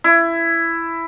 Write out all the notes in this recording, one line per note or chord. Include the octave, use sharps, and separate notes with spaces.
E4